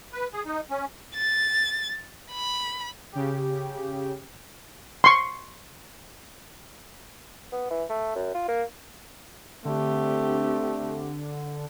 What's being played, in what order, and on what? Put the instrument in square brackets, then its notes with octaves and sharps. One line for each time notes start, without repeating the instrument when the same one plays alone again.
[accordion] B4
G#4
D#4
C#4
[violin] A6
B5
[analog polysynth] C#3 G4
[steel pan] C6 C#6
[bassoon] B3
E3
A3
F#2
F4
A#3
[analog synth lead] D3 [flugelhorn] A3 [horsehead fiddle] C4 G4